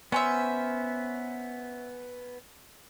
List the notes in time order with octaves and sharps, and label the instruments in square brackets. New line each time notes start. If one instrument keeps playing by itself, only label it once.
[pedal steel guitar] B3 G#5 [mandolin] C#4 C5 E5